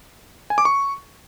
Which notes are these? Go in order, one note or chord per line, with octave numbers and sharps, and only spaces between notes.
G#5
D6
C#6